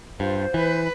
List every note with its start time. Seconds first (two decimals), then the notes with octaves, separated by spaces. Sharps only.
0.20 G2 F4 C5
0.54 E3 B4